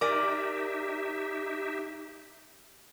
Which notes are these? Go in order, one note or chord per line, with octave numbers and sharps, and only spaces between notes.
D#4 G4 A#4 D5 E5 G#5 D6